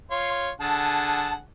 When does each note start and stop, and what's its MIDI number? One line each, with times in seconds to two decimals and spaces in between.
0.11 0.51 65
0.11 0.51 73
0.11 0.51 84
0.61 1.40 50
0.61 1.40 68
0.61 1.40 78
0.61 1.33 81